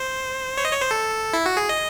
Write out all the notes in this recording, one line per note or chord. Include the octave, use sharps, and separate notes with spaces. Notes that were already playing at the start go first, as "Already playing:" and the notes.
Already playing: C5
C#5
D#5
C#5
C5
A4
E4
F#4
G#4
D#5